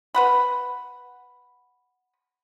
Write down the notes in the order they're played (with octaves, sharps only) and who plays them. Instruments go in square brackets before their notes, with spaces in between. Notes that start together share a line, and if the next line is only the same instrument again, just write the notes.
[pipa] B4 F#5 B5